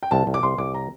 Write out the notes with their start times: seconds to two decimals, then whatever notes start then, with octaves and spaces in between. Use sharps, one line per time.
0.03 G5
0.11 C2 A5
0.27 C2
0.34 D6
0.43 C2 C6
0.58 C2 D6
0.74 A#5